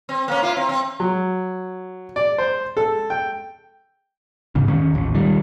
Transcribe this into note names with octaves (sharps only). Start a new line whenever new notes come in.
C4
A#3 C#4
E4 F4
C4
C4
F#3
D5
C5
A4
G5
E2 G#2 C#3
D#3 C#4
A1 D#2
B1 D#3 G3